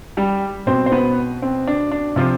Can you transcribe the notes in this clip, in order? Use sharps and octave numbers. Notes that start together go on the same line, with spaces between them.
G3 G4
B2 C4 C5
C5
B3 B4
C4
D4
D4
C3 F3 F4